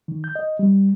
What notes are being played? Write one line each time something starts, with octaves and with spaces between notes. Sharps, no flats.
D#3
G6
D#5
G3